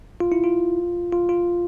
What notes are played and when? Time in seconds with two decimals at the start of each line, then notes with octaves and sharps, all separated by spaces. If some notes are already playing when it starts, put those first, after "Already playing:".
0.20 F4
0.32 E4
0.44 F4
1.12 F4
1.29 F4